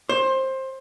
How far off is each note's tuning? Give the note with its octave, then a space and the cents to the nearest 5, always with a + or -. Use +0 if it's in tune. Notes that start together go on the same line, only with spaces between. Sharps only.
C5 +20